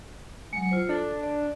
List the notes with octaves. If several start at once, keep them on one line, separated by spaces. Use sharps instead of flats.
F#3 G#3 C#7
E4 F4 C5
D4 A4
D5